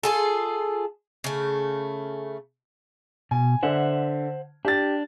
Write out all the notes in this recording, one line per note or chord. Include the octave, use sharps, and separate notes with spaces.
F4 G#4 A4
C#3 A3
B2 G#5
D3 C5 E5 F#5
D4 G4 A6